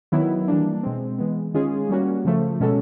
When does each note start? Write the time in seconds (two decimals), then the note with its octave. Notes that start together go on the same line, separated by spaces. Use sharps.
0.12 D#3 F#3 B3 E4
0.48 E3 G3 A#3 D4
0.83 B2 G#3 C4
1.18 E3 G#3 B3
1.54 D#3 G#3 C#4 F4 G#4
1.89 G3 A#3 C#4 F#4
2.25 C#3 F3 A3
2.60 B2 G#3 C#4 F#4 A4